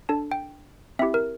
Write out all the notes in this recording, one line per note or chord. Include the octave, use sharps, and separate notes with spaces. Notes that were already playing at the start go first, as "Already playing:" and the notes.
D4 A4 A5
G5
C4 E4 G4 E5
A#4